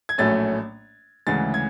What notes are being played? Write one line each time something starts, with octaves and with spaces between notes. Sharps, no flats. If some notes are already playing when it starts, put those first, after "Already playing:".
G#6
A#1 A2 F#3 A3 C#4 A6
D2 C#3 E3 G#3 A6
G#6